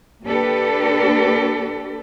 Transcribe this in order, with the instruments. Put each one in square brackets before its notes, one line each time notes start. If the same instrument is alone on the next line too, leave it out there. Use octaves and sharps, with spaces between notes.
[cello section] A#3 D4 G4 A4 B4